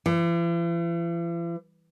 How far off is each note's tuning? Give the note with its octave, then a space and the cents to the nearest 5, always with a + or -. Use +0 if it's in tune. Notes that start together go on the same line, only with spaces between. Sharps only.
E3 +45